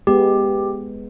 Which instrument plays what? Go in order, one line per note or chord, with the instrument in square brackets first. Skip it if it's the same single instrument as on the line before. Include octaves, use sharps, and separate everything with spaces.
[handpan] G#3 B3 [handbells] G4